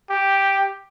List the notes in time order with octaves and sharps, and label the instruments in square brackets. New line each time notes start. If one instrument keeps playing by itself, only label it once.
[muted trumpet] G4